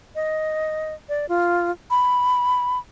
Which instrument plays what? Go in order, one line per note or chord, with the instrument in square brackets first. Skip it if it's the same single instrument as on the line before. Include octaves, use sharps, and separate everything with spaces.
[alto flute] D#5
D5
F4
B5